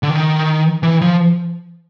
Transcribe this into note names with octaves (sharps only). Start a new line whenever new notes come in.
D3
D#3
E3
F3